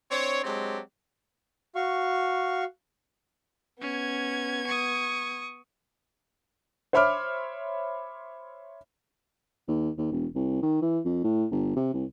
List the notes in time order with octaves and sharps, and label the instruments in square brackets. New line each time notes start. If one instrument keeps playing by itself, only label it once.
[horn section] C4 D4 C5 C#5
F#3 G#3 C4 D4 G4
[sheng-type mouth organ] F#4 F5 C#6
[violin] B3 G#6 [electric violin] C#4
[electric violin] C#6 D#6
[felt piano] C5 C#5 E5 B5 D6 F6
[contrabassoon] D#2
D#2
E1
C2
D#3
E3
F2
A2
G1
C3
C2